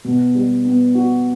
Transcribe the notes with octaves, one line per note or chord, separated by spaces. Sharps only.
B2
G3
B3
F#4